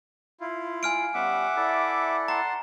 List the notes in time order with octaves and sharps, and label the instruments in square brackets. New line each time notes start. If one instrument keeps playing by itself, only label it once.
[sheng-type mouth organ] E4 F4
[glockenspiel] G#5 F6 D7
[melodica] G3 B3 C#4 [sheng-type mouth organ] E5 F#5 D6
[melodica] E4 A4 D5
[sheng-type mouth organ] F#5 A5 C6 [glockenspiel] A#5